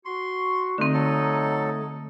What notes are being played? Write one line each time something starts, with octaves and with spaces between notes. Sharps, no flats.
F#4 C6 C#6
D3 A3 C4 D#4
F#3 A4